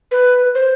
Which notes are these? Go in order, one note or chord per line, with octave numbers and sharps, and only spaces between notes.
B4
C5